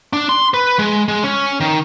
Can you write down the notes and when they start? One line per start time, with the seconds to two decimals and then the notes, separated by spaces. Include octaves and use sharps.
0.13 D4
0.29 C6
0.54 B4
0.79 G#3
1.08 G#3
1.23 C#4
1.60 D#3